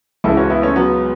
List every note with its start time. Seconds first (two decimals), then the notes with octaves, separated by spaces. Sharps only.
0.24 C#2 C#3 E3 E4 A4
0.37 C#4 F#4
0.50 B3 E4
0.62 A3 C#4
0.76 F#3 B3